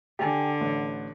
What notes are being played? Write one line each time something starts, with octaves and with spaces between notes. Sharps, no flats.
D3 G4 G#5
A1